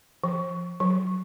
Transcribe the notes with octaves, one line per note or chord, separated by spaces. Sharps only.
F3
F#3